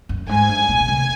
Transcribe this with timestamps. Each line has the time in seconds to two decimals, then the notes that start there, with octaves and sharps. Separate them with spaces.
0.09 F#2
0.29 G#2 G#5
0.49 G2
0.69 B2
0.80 B2
0.88 C3